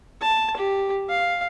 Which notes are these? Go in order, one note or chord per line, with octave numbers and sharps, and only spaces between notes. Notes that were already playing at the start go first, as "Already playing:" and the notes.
A5
G4
F5